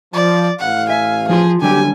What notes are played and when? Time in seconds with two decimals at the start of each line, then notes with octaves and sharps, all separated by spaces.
0.14 F3 D5
0.60 A1 F5 F#5
0.90 E5 G#5
1.29 F3 F4 G#4 C6
1.62 D3 F#3 G3 G4 G#5